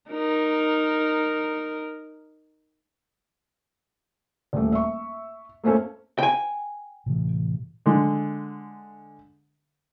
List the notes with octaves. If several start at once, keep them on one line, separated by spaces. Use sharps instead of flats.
D#4 A#4
D#1 A3
E5 C#6
A3 A#3 C4 C#4 A4
G5 G#5
A2 C3 E3
D3 G#3